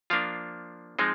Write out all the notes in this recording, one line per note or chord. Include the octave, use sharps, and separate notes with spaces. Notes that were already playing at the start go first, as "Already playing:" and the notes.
F3 A#3 D4 F4 F5
F3 G#3 C4 D#4